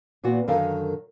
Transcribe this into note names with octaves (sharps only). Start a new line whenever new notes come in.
A#2 E3 B3 F#4
F#2 D3 D#3 A4 A#4 F5